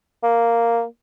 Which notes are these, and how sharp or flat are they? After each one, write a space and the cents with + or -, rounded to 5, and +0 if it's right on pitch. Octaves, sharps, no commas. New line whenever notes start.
A#3 -5